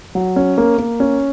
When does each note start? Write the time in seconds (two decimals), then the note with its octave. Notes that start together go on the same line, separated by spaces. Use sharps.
0.15 F#3
0.36 C#4
0.58 A#3
0.78 A#3
1.00 C#4